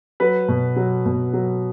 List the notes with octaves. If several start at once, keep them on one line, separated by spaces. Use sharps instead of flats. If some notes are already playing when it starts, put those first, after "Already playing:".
F#3 B4
B2
F#3
B2
F#3